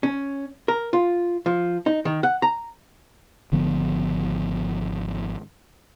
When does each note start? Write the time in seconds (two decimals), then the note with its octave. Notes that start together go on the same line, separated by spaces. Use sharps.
0.03 C#4
0.68 A#4
0.93 F4
1.46 F3
1.86 D#4
2.05 D#3
2.23 F#5
2.42 A#5
3.52 G#1 D3 F3 B3